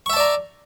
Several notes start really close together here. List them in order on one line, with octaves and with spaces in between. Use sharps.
C#6 E5 A5 D5 A#5